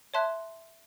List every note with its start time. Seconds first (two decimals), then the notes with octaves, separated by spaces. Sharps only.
0.14 C#5 E5 A5 C6 F#6